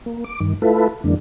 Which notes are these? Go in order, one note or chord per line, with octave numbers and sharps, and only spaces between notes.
A#3
D6
G2 D#3
A3 E4 F4 A4 B4
F2 D3 E3 G#3 A#3 D4